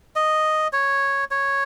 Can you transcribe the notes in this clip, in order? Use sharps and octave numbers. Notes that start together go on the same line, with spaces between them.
D#5
C#5
C#5